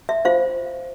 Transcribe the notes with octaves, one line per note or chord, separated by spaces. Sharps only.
E5
F4 C5 F5